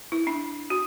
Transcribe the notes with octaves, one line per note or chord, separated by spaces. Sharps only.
E4
D4
F#4